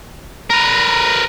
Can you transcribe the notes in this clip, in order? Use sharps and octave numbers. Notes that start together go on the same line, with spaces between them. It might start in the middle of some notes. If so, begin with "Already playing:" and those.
A#4 B4